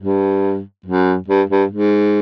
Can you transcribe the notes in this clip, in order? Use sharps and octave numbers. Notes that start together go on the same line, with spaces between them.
G2
F#2
G2
G2
G#2